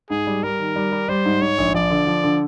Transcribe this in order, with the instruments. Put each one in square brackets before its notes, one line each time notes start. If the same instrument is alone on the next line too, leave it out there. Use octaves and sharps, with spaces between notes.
[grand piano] G#2 [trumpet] G#4
[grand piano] G3
[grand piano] G3 [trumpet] A#4
[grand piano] D#3
G3
G3
[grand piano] G3 [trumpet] C5
[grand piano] G#2
[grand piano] G#2 [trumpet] C#5
[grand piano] A#1
[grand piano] F3 [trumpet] D5
[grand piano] D3
F3
D3